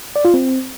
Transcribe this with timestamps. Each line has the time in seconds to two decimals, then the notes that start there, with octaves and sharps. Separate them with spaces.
0.16 D5
0.25 F4
0.34 C4